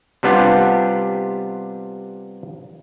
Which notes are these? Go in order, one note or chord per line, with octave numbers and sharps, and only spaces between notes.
C3 G3 B3 D4 F4 G4